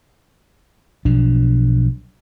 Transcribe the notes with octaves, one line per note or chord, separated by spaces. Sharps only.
B1 B2 F3 D4